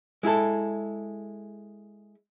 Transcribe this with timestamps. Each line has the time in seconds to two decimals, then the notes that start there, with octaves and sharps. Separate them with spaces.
0.23 G#3 E4 G#4 A4